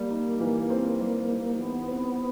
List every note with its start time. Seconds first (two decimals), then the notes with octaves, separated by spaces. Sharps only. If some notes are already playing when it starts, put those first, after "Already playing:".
Already playing: G3 A#3
0.11 D#4
0.40 E3
0.70 C4
1.00 G3
1.29 D#4
1.58 E3 B3
1.88 C4